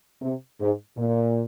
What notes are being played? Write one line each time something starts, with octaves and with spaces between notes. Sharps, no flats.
C3
G#2
A#2